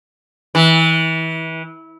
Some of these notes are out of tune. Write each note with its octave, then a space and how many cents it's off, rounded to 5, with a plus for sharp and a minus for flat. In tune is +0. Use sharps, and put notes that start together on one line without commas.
E3 -25